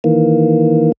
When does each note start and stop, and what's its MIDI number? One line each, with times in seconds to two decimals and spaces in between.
0.04 0.92 51
0.04 0.92 52
0.04 0.92 58